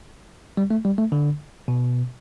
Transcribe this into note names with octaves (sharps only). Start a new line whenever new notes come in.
G3
A3
G3
A3
D3
B2